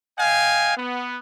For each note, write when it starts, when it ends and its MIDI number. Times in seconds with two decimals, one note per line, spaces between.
0.18 0.76 75
0.18 0.76 77
0.18 0.76 79
0.18 0.76 80
0.77 1.18 59